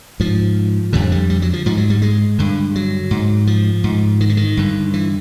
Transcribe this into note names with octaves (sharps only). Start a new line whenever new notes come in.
G#2 F3
F2 D3 G3
G3
G3
F#3
F3
G#2 F3
F#3
G3
G#3
G2 D3
F#3
G#2
F3
G#2
D#3
D3
D#3
G2 D3
E3